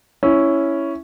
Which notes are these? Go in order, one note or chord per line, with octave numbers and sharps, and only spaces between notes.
C#4 E4